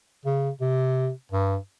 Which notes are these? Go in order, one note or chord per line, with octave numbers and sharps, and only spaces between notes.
C#3
C3
G2